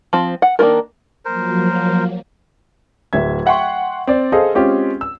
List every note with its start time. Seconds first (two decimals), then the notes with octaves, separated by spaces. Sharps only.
0.13 F3 C4
0.42 F#5
0.59 D#3 A#3 D4 F4 A#4
1.25 F3 F#3 A#3 A#4 C5
3.13 D1 E5 G#6
3.46 E5 F#5 G5 C6 C#6
4.07 C4 D5
4.32 G#4 A4 C5 D#5 F5
4.55 G#3 C4 C#4 F4 G4
5.01 E6